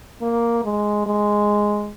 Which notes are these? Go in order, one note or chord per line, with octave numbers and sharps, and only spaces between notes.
A#3
G#3
G#3